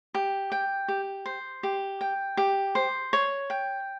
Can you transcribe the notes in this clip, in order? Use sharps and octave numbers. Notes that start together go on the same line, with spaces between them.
G4
G5
G4
C5
G4
G5
G4
C5
C#5
G5